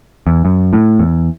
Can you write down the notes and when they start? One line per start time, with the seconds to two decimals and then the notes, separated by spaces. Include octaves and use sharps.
0.27 E2
0.45 F#2
0.73 A2
0.99 E2